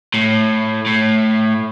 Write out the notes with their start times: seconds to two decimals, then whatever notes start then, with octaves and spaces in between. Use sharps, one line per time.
0.14 A2
0.87 A2